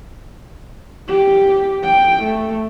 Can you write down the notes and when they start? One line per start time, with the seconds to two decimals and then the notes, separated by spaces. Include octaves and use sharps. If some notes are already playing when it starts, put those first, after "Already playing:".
1.08 G4
1.84 G5
2.23 A3